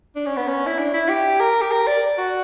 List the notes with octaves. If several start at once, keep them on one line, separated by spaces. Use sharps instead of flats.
D4
C#4
B3
C#4
E4
D4
E4
G4
A#4
G4
A#4
D5
F#4